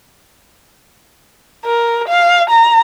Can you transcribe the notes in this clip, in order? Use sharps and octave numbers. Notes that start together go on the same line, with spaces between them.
A#4
F5
A#5